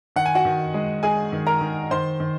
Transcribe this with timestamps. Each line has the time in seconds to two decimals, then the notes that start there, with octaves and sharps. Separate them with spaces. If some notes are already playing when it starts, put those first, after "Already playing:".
0.16 D#3 F#5
0.26 G#5
0.35 F#4 F#5
0.45 D#3
0.74 G#3
1.03 G#3 G#4 G#5
1.32 D#3
1.47 A#4 A#5
1.61 D#3
1.91 D#3 C5 C6
2.20 D#3